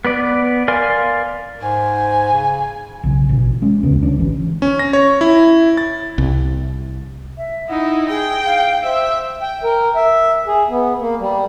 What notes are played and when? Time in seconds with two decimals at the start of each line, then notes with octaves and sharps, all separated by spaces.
0.05 B3 B4 D5
0.68 A#4 D5 F5 G#5 C6
1.61 G#2 G#5
2.33 C#3
3.04 B1 C#3
3.29 A1 B2
3.62 G#3 C#4
3.83 D#1 D2 C#3 B3
4.03 D2 C#4 D4
4.18 G#1 E3
4.62 C#4
4.79 A#6
4.93 C#5
5.21 E4
5.77 A6
6.18 C2
7.37 E5
7.68 D#4 E4 F#5
8.09 G#4 G5
8.45 F5
8.83 C5 E5
9.42 G5
9.64 A#4
9.95 E5
10.47 G#4
10.69 B3
10.99 A#3
11.19 G3